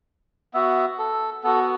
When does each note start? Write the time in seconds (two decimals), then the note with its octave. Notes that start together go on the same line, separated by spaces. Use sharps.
0.54 B3 F#4 E5
0.99 A4
1.44 B3 F#4 A4